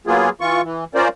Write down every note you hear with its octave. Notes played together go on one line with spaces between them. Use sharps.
F#3 A#3 B3 F4 G#4
E3 F4 C#6
E3
C#4 F4 A#4 C5 D5